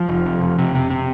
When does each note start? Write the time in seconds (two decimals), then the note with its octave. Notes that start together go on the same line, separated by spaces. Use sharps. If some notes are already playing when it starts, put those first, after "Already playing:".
Already playing: F3
0.09 F1
0.26 F2
0.41 F1
0.59 C3
0.75 C3
0.91 C3